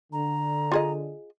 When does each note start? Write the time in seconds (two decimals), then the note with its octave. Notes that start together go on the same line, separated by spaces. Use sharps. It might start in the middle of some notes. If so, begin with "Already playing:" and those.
0.13 D3 A#5
0.72 F4 G#4 D#5